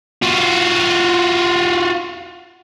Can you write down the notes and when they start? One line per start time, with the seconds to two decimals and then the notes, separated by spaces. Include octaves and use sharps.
0.23 F4 F#4